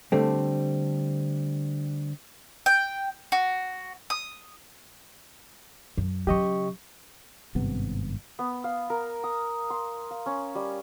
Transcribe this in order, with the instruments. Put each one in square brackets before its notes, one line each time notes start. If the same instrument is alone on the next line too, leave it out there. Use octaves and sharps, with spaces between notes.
[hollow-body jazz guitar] D3 G3 A3 C4
[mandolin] G5
F#4
D#6
[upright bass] F#2
[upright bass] C#3 F#3 [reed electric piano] G4 D#5 C#6
[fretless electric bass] G#1 G2 C3 B3
[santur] B3
F5
A#4
D#6
C6
F5
C#4
G3